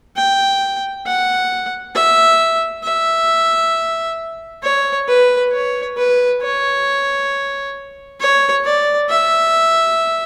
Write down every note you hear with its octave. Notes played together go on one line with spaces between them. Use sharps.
G5
F#5
E5
E5
C#5
B4
C#5
B4
C#5
C#5
D5
E5